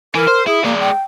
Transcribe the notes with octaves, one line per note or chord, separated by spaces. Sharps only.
E3 A#4
C5
E4 G#4
G#3 A#3 D5
G5